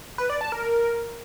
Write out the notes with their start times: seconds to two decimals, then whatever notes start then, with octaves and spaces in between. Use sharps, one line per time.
0.18 B4
0.30 D5
0.41 A5
0.52 A#4